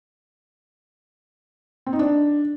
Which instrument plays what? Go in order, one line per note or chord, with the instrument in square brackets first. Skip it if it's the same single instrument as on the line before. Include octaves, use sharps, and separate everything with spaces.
[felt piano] C4
D#4
D4